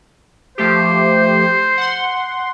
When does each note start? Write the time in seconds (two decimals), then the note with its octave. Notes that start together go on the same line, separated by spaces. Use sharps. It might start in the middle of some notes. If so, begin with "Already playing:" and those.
0.58 F3 A3 G4 C5
1.78 F#5 C6